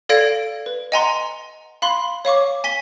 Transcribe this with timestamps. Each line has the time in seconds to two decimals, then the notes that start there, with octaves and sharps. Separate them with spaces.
0.09 A4 D5 F5 G#6 A#6 D7
0.66 B4
0.92 D#5 F#5 G#5 A#5 C6
1.82 F5 B5 C6
2.25 C#5 F5 C#6 D6
2.64 G#5 B6 G7